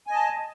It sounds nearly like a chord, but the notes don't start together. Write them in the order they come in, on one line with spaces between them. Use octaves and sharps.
G#5 D#5 A5